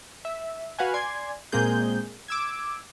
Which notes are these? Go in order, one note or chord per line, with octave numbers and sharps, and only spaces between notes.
E5
F#4 B4 F5 F#5 G#5
D5 G#5 C6 G#6
A#2 G#3 A#3 C4 G#4 G6
D6 E6 G#6